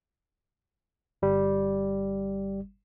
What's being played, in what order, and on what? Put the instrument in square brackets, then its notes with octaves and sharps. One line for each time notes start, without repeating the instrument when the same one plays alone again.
[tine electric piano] G1 G3